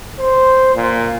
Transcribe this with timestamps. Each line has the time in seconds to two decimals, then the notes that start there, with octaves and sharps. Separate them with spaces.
0.19 C5
0.75 A#2